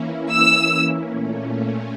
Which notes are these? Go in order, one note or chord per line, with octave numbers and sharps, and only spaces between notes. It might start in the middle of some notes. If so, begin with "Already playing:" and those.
Already playing: E3 A#3 C#4 E4
E6
A#2 A3 C#4